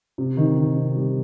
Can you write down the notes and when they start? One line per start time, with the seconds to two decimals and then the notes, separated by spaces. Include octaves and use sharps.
0.18 C3
0.37 D#3
0.57 D#3
0.76 C3
0.95 G3